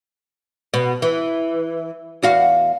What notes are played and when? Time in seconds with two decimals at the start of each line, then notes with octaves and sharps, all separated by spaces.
0.74 B2
1.02 E3
2.22 E2 F#4 F5